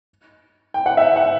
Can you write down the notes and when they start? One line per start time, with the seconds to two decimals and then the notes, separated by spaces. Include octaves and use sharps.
0.74 G5
0.86 F#5
0.97 E5
1.16 F#5